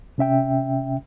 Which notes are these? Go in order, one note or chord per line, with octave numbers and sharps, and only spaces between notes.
C3 C#4 E5 G5